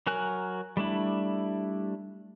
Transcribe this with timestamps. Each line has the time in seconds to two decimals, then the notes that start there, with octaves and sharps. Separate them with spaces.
0.07 F#3 F#4 A#4 G#5 F#6
0.77 G3 A3 D4 E4